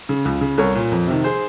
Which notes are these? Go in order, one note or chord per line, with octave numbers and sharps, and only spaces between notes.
C#3
C#2
C#3
C2 A#4 C#5
A#2
F2
C3 D#3
G#4 C5